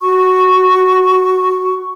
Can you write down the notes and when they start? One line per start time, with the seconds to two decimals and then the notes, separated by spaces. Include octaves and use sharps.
0.01 F#4 C#6